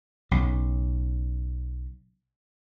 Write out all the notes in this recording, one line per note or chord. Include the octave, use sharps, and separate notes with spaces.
B1 C#3